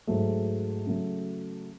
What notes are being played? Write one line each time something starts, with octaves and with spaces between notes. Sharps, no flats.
G#2 F#3 A3
C#3 F#3 A3